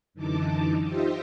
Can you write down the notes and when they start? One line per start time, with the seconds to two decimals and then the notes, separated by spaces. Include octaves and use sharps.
0.14 F#2 D3 E3 D#4 A5 D6
0.83 D#4 F4 G4 C5 D#5 E5